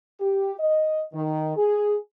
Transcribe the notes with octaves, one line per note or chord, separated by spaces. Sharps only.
G4
D#5
D#3
G#4